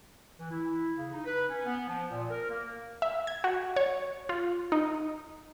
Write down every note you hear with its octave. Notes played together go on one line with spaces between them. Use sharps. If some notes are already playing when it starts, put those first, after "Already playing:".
E3
E4
C#3
D#4
B4
C#4
B3
F3
A#2
A#4
A#3
E5
G#6
F#4
C#5
F4
D#4